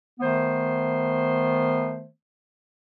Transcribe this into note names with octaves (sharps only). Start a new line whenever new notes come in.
D#3 A3 B3 C5